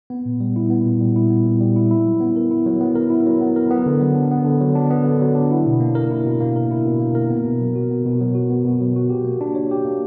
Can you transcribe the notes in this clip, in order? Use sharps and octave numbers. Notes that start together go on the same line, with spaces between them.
B3
A#2
G3
E4
B3
A#2
G3
E4
B3
A#2
G3
E4
E4
F#3
B3
A#4
E4
F#3
B3
A#4
E4
F#3
B3
A#4
B3
D3
F#3
D4
B3
D3
F#3
D4
B3
D3
F#3
D4
E4
B2
A#3
A#4
E4
B2
A#3
A#4
E4
B2
A#3
A#4
B3
B2
F#3
F#4
B3
B2
F#3
F#4
B3
B2
F#3
F#4
G4
A#3
D4
C#5
G4
A#3